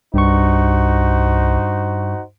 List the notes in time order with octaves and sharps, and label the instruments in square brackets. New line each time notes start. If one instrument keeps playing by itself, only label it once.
[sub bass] C2 [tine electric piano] G2 C#6 [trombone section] D#4 F#4 C5